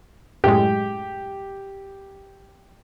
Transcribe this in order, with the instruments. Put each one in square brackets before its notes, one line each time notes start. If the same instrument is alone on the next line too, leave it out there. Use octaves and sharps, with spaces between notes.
[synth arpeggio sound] F#2 A2 G#3 [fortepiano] G4